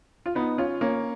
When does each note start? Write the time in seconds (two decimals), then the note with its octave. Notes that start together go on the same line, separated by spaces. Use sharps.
0.26 F4
0.35 B3 D#4
0.58 C#4 F4
0.81 A#3 C#4